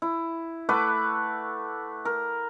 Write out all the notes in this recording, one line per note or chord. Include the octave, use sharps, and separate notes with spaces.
E4
A3 B4 F#5 D6
A#4